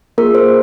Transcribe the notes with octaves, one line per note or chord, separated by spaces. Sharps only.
A#3 F4 G#4 A#4
C5